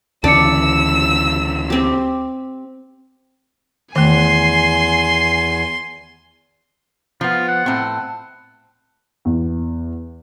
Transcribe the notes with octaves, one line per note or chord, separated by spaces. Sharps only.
D2 C#3 E3 D5 A5 E6 C#7
C4 G4
E2 D#3 A3 G#5 C6 C7
F3 B3 F4
F#5
A2 C4
E2